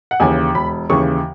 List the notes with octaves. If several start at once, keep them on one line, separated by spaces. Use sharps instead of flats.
F#5
D#2 C#3 E3 G#5
E1 B5
D#2 C#3 E3 C#6